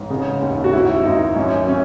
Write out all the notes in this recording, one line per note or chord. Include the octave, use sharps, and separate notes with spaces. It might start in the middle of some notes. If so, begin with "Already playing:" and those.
Already playing: A1 G#2
C#3
D#2
F#4
G#2 E4
G#1 D#4
F#2 C#4
C#4